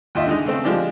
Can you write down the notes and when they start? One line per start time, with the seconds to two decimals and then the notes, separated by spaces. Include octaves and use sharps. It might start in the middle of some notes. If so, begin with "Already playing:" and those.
0.15 D#2 F4 D#5 E5
0.26 D3 G#3 D#4
0.46 C#3 A3 C4 A4
0.64 D3 F3 G#3 D4 G4